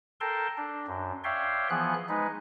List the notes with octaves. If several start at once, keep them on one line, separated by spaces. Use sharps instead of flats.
A4 A#4 G5 A5 C6
D4
F#2
C#5 D5 E5 F5 G5 C6
E3 F3 B3 G#4 F#6
G#3 D#4 B4